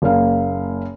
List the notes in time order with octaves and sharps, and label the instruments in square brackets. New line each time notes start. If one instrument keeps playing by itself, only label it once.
[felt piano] F#1 A#3 F5